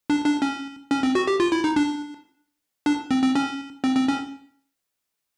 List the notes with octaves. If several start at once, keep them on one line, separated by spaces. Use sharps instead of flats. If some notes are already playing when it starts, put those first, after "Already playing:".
D4
D4
C#4
C#4
C4
F#4
G4
F4
E4
D#4
D4
D4
C4
C4
C#4
C4
C4
C#4